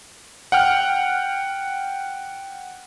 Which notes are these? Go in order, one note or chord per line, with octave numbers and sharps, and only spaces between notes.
F#5 G5 F6